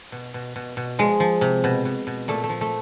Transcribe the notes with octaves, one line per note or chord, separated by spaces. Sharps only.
B2
B2
B2
B2
F3 G#3
F3
C3
B2
B2
B2
A#2 A3
A3
F3
A3